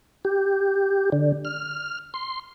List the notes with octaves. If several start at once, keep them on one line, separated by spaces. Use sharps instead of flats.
G4
D3
F6
C6